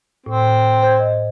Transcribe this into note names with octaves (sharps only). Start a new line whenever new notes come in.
A2 C4
C5 G6 G#6
D#5